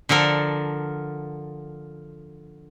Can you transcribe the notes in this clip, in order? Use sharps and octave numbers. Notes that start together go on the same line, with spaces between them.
D3 F3 A4 A#4